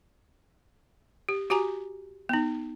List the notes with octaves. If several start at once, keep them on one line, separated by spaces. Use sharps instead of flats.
G4
F#4 G4 G#5 A#5
B3 D#4